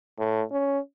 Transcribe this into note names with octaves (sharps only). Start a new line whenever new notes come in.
A2
C#4